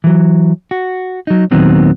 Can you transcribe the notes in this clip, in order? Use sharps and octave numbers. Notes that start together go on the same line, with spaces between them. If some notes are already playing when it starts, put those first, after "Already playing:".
E3 F#3
F#4
F#3 D#4
D#2 A#2 D#3 F#3 B3 C4